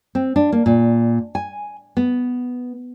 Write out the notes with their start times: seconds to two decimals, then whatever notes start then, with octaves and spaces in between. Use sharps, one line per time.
0.15 C4
0.36 D4
0.52 A#3
0.66 A#2
1.35 G#5
1.97 B3